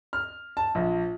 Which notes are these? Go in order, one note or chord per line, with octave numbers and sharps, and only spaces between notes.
F6
A5
A#1